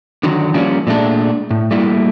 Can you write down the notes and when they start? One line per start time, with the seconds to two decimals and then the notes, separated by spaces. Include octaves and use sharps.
0.23 D3 D#3 F#3
0.54 F3 G3 A#3 C#4
0.87 A#2 G#3 A3 D4
1.51 A2
1.71 G3 A3 A#3 E4